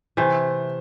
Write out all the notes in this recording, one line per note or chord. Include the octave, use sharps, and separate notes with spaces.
C3 E3 A3 C5